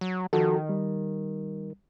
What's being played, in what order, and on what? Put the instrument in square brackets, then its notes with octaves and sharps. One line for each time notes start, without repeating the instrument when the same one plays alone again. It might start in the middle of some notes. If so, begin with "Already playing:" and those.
[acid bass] F#3
[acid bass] D#3 [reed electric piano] F3 F#4 A4
[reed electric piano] G3